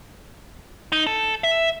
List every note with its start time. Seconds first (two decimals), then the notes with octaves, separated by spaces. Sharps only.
0.92 D#4
1.07 A4
1.44 E5